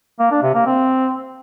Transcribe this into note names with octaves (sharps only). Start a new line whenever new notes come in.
A#3
D4
C3
A#3
C4